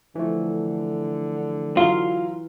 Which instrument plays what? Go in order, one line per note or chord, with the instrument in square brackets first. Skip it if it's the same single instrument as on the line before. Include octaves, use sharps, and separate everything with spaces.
[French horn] D3 [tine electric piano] E3 F3 A3
[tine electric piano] E3 [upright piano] F#3 F5 G7 [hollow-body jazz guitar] F4